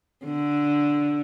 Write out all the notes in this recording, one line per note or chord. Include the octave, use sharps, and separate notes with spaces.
D3